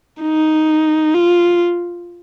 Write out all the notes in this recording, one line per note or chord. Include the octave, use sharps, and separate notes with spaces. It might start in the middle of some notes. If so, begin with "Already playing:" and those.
D#4
F4